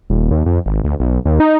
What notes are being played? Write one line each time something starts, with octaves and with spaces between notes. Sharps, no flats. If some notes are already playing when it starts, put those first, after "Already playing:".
D#1
D#2
F2
G#1
D2
B1
D#2
D#4